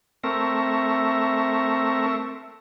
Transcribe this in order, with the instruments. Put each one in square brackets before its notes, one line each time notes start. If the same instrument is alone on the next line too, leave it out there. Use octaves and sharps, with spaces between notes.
[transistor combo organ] A3 E5 C#6 [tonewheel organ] C4 A#4